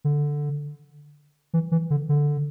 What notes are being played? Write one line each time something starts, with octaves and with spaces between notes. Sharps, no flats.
D3
E3
E3
D3
D3